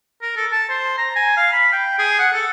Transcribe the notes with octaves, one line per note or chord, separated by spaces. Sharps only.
A#4
A4
A5
C5
A#5
G#5
F5
B5
G5
G#4
F#5
A4